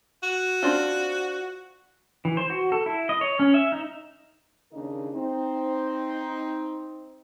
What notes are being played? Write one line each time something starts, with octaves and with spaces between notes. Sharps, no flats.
F#4
C4 D4 F4
E3
C5
F#4
A4
E4
D#5
C#5
C#4
E5
D#4
D#2 C#3 D4 D#4 A#4 D#5
C4 D#4